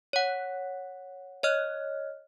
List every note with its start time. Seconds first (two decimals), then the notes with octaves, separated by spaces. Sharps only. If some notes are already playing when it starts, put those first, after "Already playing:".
0.13 C#5 F#5
1.43 C#5 D#5 F6